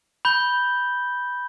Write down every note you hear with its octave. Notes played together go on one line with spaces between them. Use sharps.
B5 G6 G7